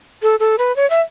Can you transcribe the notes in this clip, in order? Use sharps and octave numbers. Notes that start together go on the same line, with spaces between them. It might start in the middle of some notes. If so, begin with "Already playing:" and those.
A4
A4
B4
C#5
E5